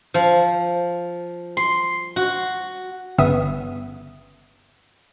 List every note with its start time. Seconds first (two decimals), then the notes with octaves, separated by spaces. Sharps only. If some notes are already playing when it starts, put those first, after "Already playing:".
0.14 F3
1.57 C6
2.16 F#4
3.18 G1 C#3 B3 E5 D#6